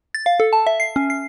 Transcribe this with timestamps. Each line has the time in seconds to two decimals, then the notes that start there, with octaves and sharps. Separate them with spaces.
0.14 A6
0.26 F5
0.40 A4
0.53 A5
0.67 E5
0.80 C7
0.96 C#4
1.10 C7